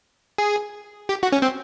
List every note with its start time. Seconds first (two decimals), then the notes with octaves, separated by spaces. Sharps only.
0.38 G#4
1.09 G4
1.23 F#4
1.32 C#4
1.42 C4